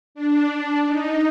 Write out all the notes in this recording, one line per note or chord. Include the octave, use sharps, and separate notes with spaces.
D4
D4
D#4